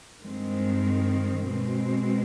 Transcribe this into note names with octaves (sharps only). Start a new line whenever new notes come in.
G2 D#3 G#3 C4
B2 G#3 C4